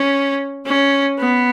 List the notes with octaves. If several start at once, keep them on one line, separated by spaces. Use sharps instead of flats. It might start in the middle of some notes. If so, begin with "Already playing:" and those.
Already playing: C#4
C#4
B3